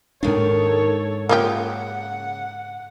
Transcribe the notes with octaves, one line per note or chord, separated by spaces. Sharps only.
D#2 G#2 D#3 G#3 D4 A4 C#5
C#3 A#3 F4 G4 F#5